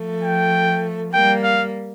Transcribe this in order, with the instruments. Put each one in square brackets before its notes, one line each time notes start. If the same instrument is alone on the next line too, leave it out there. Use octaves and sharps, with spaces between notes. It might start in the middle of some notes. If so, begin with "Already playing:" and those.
Already playing: [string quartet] F3 A3
[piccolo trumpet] G5
[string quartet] G3 A#3 [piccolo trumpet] G5
[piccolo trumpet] F5